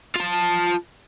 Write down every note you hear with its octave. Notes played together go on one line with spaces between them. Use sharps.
F4 A5